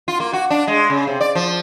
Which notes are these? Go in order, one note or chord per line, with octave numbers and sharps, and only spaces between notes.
F4
A#3
F#4
D4
G#3
C#3
C3
D5
F3